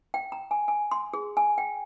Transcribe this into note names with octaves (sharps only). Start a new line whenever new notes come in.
G5
A#5
G#5
G#5
C6
G#4
G#5
G5